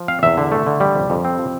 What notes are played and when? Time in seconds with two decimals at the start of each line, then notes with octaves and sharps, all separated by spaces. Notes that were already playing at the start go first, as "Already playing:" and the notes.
Already playing: F3
0.08 C4 F5
0.23 E2 E5
0.37 D3
0.51 A3
0.66 D3
0.80 G3
0.95 F2
1.10 F2
1.24 C4
1.39 F3